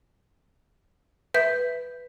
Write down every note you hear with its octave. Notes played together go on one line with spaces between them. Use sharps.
B4 E5 G6